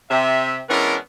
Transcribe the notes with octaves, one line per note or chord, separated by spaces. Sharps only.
C3 E5
E3 G#3 B3 C#4 D4 A#4